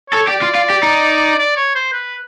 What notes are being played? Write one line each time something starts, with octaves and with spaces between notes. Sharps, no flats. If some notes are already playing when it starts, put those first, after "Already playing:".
A4 C#5
G4 D5
F4
F4
G4
D#4
D5
C#5
C5
B4